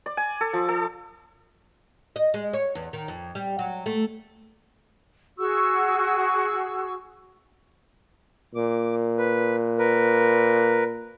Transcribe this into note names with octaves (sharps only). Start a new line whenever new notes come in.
D5
G#5
A4
F3
A4
D#5
G#3
C#5
E2
D#3
F2
G3
F#3
A3
F#4 G#4 C#6 E6
A#2 D6
B4
A#4 B4